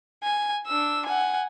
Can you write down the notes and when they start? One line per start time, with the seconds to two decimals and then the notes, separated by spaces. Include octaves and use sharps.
0.23 G#5
0.67 D4 E6
1.05 F#5 G#5